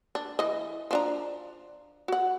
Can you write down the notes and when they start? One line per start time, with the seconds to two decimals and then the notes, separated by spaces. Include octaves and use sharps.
0.15 D4
0.39 E3 D#5
0.91 F3 D4 A#5
2.08 F#4 F#5